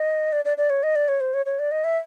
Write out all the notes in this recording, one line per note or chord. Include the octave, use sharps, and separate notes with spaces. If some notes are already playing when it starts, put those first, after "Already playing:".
Already playing: D#5
D5
D5
D5
C#5
D#5
D5
C#5
C5
C#5
C#5
D5
D#5
E5